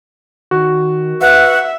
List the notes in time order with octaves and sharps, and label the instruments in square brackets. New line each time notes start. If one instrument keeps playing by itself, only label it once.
[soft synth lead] D#3 [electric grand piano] F#4
[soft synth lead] B4 [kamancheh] E5 [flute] F#5